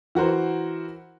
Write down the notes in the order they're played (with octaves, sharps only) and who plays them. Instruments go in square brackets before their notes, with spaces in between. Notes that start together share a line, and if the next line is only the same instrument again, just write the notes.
[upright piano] E3 F#4 A#4 C5